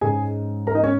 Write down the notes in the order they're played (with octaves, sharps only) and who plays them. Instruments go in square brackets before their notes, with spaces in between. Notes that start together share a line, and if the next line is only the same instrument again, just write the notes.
[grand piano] G#2 G#3 C#4 G#4 G#5
A#4 A#5
D#4 D#5
C#4 C#5